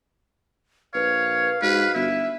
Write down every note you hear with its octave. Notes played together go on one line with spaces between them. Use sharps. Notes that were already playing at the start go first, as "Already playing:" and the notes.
A#1 B4 C#5 F5
G#2 F#4 B4
G1 E4 E5